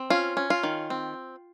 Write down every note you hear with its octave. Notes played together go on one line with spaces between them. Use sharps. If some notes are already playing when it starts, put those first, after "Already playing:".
Already playing: C4
C#4 F4
C#4
F4
D#3
C4